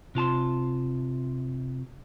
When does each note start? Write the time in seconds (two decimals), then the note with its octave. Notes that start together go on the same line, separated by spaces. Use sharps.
0.15 C3 F4 A5 C6